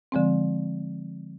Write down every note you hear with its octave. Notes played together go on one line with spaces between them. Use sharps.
D3 F3 G#3 C4